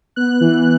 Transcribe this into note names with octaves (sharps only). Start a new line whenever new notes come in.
B3 F#6
E3